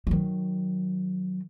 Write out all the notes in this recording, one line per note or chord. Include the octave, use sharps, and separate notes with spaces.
D#3 F#3